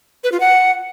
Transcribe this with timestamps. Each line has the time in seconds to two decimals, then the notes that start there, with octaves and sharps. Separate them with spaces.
0.24 B4
0.32 F4
0.40 F#5